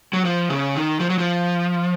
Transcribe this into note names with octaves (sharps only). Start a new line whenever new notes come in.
F#3
F3
C#3
D#3
F3
F#3
F3